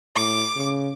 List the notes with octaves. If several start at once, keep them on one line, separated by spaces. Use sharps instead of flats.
A2 D6
C#3